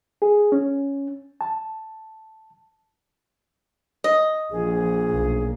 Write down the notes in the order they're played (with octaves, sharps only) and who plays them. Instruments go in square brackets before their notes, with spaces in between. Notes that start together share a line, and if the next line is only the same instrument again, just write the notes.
[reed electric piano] G#4
C#4
A5
[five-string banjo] D#5
[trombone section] A#1 [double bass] F3 [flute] G#4
[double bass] B1 A#3